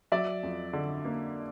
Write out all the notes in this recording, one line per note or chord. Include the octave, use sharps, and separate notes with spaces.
F#3 D5 E5
F2
D3
A#3